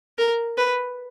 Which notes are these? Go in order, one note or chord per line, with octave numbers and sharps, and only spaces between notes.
A#4
B4